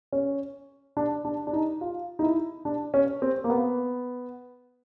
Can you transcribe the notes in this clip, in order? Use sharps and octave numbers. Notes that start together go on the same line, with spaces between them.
C#4
D4
D4
D4
D#4
F4
D#4
E4
D4
C#4
C4
A#3
B3